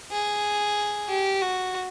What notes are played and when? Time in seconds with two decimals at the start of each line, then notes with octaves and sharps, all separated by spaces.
0.11 G#4
1.09 G4
1.42 F#4